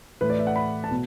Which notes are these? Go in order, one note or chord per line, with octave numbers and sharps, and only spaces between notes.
A2 E3 A3 B4
D5
E5
F#5
B5
A5
B2